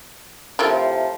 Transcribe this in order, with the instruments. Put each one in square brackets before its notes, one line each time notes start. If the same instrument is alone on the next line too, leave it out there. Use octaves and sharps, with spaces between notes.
[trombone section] A2 C3 F3 [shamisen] E4 A4 A#4